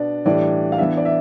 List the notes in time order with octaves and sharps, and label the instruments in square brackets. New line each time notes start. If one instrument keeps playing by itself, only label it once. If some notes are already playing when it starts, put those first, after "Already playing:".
Already playing: [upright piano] B2 B3 D4 D5
A2 E3 G3 D4 D5
F5
E3 B3 D4 E5
D5
E5